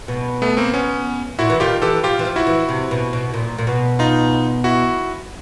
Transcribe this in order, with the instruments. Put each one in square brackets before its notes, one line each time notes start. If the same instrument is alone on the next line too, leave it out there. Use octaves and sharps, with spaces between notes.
[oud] B2
[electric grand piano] A3 B3
A#3 C4
B3 C#4
[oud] A#2 [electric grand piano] E4 F#4
[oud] E3
[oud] D#3 [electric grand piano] F4 G4
[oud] E3 [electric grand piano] G4 A4
[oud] F3 [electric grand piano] F4 G4
[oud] E3
F3
[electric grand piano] E4 F#4
[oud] E3
C3
B2
B2
A#2
A#2
B2
[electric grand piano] D#4 F4
E4 F#4